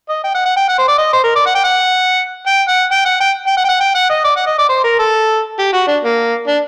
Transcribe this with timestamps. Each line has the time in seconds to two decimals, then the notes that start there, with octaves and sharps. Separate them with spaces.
0.09 D#5
0.24 G5
0.34 F#5
0.45 F#5
0.56 G5
0.69 F#5
0.78 C5
0.88 D5
0.98 D#5
1.13 C5
1.24 A#4
1.35 D5
1.46 F#5
1.55 G5
1.64 F#5
2.47 G5
2.68 F#5
2.91 G5
3.05 F#5
3.20 G5
3.47 G5
3.57 F#5
3.64 G5
3.69 F#5
3.81 G5
3.95 F#5
4.09 D#5
4.25 D5
4.36 F#5
4.47 D#5
4.58 D5
4.69 C5
4.84 A#4
4.99 A4
5.59 G4
5.73 F#4
5.87 D4
6.03 A#3
6.47 D4